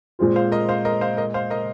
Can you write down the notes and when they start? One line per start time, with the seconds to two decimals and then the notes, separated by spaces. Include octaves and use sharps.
0.19 A#2 G#3 C4 F4
0.36 C5 F5
0.52 A#4 D#5
0.69 C5 F5
0.85 A#4 D#5
1.01 C5 F5
1.17 A#4 D#5
1.34 C5 F5
1.50 A#4 D#5